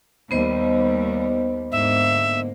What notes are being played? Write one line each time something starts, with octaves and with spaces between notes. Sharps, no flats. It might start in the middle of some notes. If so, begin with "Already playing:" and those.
D#2 G3 B3 C5 D#5
G#2 D3 A#3 E5